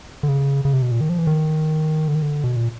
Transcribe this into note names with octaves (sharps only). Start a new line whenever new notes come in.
D3
C#3
C#3
C3
B2
A#2
D#3
F3
E3
D#3
D3
D#3
D3
B2
A#2